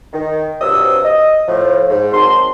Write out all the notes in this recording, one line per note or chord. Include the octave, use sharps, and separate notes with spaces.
D#3
G2 C3 F3 F#3 D#6 E6
D#5
A2 F3
G#2
D#3 F#3 C4 A5 C6